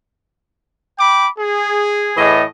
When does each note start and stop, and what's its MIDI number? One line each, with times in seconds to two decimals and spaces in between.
0.99 1.28 79
0.99 1.28 83
0.99 1.28 86
1.38 2.35 68
2.17 2.42 45
2.17 2.42 52
2.17 2.42 75